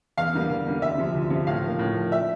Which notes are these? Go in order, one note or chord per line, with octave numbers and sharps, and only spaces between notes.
E2 F5
D3 G3 A#3
E2
D3 G3 A#3
D2 E5
C3 F3
D2
C3 F3
A2 F5
F3 A#3
A2
F3 A#3
E5